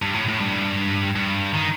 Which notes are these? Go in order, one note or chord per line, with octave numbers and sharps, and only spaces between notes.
G2
A2
A2
G2
G2
D#3